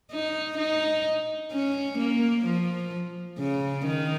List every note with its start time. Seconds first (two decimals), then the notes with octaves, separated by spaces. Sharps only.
0.11 D#4
0.57 D#4
1.52 C#4
1.98 A#3
2.45 F3
3.38 C#3
3.86 D#3